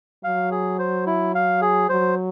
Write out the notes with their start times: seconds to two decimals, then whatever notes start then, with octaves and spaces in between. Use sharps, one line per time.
0.24 F#3 F5
0.51 G#4
0.79 C5
1.06 E4
1.35 F5
1.62 G#4
1.89 F#3 C5